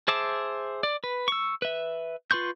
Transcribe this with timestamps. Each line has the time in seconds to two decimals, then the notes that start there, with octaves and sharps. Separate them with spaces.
0.08 G#4 C5 E5 A5 D6
0.83 D5
1.04 B4
1.28 C#6 E6
1.62 B4 E5
2.31 F4 B4 C6 C#6 G6